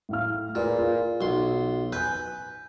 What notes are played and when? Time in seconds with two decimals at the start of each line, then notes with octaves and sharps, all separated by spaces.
0.09 A2 F5 F6
0.55 A#2 G#4 B4
0.79 F4
1.21 B1 C6
1.93 B4 G#5 G6